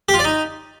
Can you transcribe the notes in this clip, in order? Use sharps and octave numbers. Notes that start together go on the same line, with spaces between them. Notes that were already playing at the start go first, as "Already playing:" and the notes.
G4
F4
D5
D#4